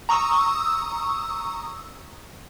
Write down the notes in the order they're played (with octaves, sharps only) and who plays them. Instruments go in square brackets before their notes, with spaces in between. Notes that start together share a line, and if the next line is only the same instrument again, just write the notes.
[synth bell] A#5 C#6 D#6 E6